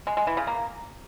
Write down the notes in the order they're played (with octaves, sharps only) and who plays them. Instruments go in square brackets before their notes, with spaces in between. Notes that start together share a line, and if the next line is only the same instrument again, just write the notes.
[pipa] G#3
G#3
E3
C#3
A#3